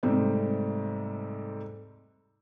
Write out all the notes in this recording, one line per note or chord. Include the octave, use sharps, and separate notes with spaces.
G#2 C3 G3 A3 C4